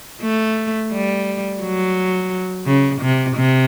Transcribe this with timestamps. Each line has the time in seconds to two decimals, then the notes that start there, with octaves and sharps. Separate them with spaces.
0.22 A3
0.92 G3
1.62 F#3
2.66 C#3
3.01 C3
3.36 C3